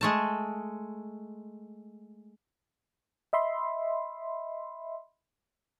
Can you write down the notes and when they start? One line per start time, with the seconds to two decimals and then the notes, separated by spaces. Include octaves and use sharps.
0.01 G#3 A3 A5
3.33 D#5 E5 B5 C6